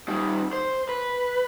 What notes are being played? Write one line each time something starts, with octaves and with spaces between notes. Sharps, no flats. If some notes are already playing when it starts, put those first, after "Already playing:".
D#3 G3
C5
B4